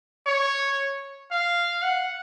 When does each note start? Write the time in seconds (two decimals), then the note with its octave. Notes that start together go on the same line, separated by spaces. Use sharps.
0.27 C#5
1.32 F5
1.83 F#5